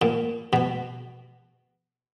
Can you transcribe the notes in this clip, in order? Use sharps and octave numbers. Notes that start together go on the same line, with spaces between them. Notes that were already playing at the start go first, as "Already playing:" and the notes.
A#2
B2